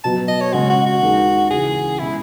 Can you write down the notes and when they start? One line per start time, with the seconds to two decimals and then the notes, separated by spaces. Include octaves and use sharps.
0.04 B2 F#3 B3 A5
0.28 D#5
0.41 C#5
0.53 C#3 G#3 C#4 F#4
0.70 F#4
0.86 F#4
1.02 D#2 D#3 G#3 D#4 G#4
1.50 C#2 C#3 E3 G#4
1.99 B2 G#3 C#4 E4